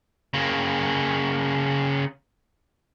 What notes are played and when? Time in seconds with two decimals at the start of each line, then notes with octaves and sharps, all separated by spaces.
0.34 C#3 A#3